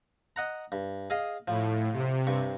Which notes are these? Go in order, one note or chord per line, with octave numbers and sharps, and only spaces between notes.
D#5 F#5 A#5
G2
G#4 D#5 F5
A2 F3
C3
G2 C#6